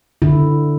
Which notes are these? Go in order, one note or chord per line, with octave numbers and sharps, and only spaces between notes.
D3 E4